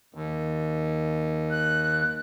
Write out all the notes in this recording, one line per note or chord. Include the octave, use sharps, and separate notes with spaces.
D#2
F#6